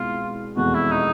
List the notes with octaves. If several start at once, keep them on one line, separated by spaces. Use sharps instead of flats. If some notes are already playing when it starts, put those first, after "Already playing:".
Already playing: C2 B2 G#3 B3 E4 F4
F1 E2 B2 G#3 F#4
E4
D#4